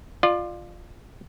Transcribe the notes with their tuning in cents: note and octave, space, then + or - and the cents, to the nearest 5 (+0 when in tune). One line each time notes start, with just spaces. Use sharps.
F4 +0 D5 +35